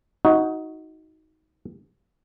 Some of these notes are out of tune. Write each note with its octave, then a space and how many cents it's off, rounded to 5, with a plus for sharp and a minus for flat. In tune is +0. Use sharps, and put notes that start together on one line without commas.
D#4 +20 F#4 +0